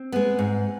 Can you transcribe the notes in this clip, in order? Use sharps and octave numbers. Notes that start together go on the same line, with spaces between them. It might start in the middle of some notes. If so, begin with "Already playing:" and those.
Already playing: C4
G#3 B3
G#2